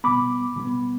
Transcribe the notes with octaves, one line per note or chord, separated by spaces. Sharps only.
B2 G3 B3 B5 D6
B2 G3 B3